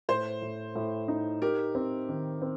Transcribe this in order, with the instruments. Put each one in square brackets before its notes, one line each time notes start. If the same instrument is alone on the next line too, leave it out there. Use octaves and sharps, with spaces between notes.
[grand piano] A2 [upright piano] C5
[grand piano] A2
A2
D#4
[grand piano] G4 [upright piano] A#4
[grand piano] C4
D#3
C4